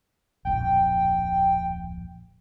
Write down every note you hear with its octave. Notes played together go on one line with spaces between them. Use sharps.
D1 A#1 F2 G5